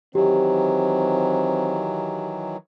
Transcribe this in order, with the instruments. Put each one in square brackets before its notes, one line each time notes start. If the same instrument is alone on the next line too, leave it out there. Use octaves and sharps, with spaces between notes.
[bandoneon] D#3 E3 F#3 [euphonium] C4 [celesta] G4